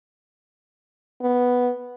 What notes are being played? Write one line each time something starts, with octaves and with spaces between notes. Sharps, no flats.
B3